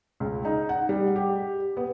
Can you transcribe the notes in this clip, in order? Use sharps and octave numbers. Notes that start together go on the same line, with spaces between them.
C#2
D#4
F#5
G3
G4
B3